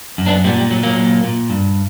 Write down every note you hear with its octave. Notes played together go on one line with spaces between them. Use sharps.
F#2
B3 D4
A#2 G3 B3
G3
A#2 F#3
F#3 A#3
A#2
A#2
G2